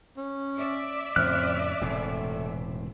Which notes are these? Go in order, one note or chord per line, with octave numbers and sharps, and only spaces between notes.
C#4
D5 E5
F2 A2 C#3 C4 F6 F#6
E1 A2 C3 A3